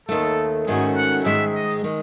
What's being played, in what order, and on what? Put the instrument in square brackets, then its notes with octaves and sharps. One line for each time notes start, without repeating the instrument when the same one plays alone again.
[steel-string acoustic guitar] D#2 D#3 A3 [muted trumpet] A4
[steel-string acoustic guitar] G#2 D#3 A3 C#4 F#4 [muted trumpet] G#4
[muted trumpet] F#5
[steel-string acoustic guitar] G#2 D#3 G#3 [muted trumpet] E5
[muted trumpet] D#5
[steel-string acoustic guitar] D#3 G#3